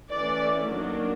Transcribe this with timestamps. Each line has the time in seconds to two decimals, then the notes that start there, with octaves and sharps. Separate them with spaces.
0.11 E3 A3 C#4 D5
0.68 D#3 F#3 A#3 D4